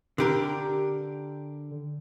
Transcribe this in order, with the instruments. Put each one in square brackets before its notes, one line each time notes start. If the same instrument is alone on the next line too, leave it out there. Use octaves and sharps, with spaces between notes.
[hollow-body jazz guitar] D3 G4 A#4